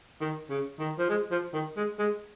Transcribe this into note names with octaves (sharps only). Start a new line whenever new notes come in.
D#3
C#3
D#3
F3
G#3
F3
D#3
G#3
G#3